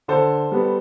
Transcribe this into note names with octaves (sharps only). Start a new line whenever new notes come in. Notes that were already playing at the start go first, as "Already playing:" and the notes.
D3 A4 C5
G3 B3